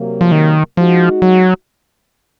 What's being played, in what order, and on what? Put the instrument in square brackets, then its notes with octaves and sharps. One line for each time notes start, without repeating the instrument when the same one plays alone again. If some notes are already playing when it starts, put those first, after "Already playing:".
Already playing: [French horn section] C3 F#3 A#3
[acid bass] F3
D#3
[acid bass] F3 [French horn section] G#3 D#4 F#4
[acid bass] F#3